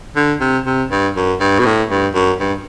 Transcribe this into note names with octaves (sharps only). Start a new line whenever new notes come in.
D3
C3
C3
G2
F#2
G2
B2
A2
G2
F#2
G2